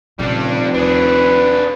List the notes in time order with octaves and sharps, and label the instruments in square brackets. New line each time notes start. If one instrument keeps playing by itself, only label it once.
[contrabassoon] F1 [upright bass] A#2 C#3 [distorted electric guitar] G3 D4
[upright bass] D#2 [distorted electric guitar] D4 G#4 [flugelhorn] B4